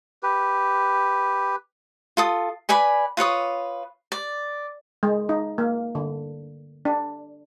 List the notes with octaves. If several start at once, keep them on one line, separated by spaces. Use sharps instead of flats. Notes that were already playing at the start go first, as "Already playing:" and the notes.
G4 B4
F4 A4 D#6
B4 D5 G#5 B5
F4 B4 C#5 D#6
D5
G#3
D#4
A#3
D3
D4